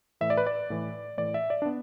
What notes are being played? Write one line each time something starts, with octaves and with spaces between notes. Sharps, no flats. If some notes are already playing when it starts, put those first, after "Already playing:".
A2 E3 E5
D5
B4
D5
A2 E3
A2 E3 D5
E5
D5
D4
B3